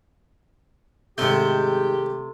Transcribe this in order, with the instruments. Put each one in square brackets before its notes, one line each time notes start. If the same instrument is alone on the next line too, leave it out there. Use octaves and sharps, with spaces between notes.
[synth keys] G#2 G6 [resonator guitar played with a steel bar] C3 A3 [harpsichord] D#3 G#3 C#4 [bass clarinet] G4